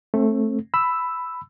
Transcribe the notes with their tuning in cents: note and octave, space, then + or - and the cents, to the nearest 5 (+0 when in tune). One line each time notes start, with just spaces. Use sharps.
A3 +0 C4 +30
B5 +10 E6 +0